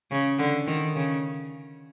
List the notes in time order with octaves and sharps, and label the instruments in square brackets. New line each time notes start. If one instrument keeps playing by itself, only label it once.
[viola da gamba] C#3
D3
D#3
C#3